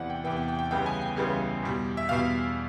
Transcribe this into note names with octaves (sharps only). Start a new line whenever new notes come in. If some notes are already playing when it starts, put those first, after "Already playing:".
Already playing: E2 C3 E3 D5 F#5
G5
E2 C3 E3 G5
G5
G5
G5
C#2 C#3 E3 G3 B3 G5
G#5
G5
C#2 C#3 E3 G3 B3
E2 B2 G3
E5
E2 B2 G3 F5